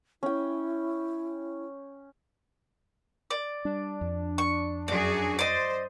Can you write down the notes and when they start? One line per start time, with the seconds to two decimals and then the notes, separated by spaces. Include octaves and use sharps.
0.23 C#4 E4 G5
3.31 D5
3.65 G3 D4
4.01 F2
4.38 C#6
4.88 F#2 F#4 G#4 D5
5.39 C5 D5 D#5